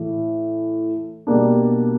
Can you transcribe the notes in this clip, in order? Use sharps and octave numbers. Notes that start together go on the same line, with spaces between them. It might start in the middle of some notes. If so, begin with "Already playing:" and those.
Already playing: A2 E3 A3
B2 G3 A#3 D4